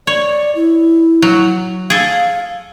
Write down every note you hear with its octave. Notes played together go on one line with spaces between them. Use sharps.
C#5 D5
E4
F#3
G#4 A4 F5